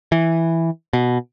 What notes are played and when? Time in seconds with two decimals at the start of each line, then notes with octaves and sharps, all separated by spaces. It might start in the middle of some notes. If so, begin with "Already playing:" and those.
0.12 E3
0.93 B2